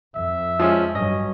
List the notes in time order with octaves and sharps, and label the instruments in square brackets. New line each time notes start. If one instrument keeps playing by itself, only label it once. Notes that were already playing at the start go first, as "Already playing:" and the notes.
[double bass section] F2 [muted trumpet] E5
[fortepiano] F3 G#3 C#4
[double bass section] G2 F#3 [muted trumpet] C#4 [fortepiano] D#5